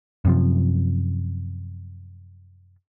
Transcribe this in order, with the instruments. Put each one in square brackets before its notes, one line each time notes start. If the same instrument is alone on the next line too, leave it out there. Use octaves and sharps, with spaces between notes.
[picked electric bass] F#2 C3 F3